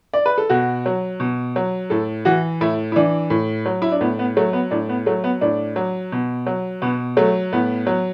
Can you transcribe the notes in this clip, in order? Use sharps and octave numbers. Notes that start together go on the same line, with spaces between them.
D5
B4
A4
B2 F#4
F#3
B2
F#3
A2 A4
E3 F#4
A2 E4
E4
E3 D4
A2
F#3
E4
D4
A2 B3
B3
F#3 A3
B3
A2 D4
B3
F#3 A3
B3
A2 D4
F#3
B2
F#3
B2 B3
F#3 A3
A2 B3
F#3